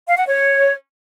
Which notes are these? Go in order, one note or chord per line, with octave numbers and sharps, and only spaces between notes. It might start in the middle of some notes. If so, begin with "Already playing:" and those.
F5
F#5
C#5